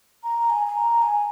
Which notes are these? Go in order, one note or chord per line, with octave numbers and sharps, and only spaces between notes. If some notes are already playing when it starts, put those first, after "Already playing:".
A#5
G#5
G#5
A#5
G#5